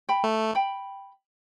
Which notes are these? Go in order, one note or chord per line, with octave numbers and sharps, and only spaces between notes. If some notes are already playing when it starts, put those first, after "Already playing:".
G5 B5
A3
G5 B5